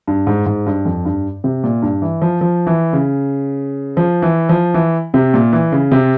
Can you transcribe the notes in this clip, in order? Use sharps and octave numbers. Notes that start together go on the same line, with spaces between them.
G2
G#2
G#2
G2
F2
G2
C3
A#2
G2
E3
F3
F3
E3
C#3
F3
E3
F3
E3
C3
A#2
E3
C#3
C3